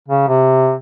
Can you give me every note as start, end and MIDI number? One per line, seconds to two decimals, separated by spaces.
0.08 0.24 49
0.28 0.74 48